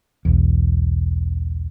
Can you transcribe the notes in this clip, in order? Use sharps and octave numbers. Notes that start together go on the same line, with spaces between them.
E1 B1 E2